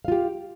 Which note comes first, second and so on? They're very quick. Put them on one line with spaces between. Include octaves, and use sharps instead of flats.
F5 F4 G4